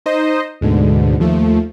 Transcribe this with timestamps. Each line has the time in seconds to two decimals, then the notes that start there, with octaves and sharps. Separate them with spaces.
0.06 D#4 C5 D#5
0.61 D2 G#2 B2 D3
1.20 D#2 F3 A3